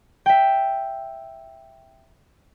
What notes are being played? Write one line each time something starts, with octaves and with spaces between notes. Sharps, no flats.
E5 G5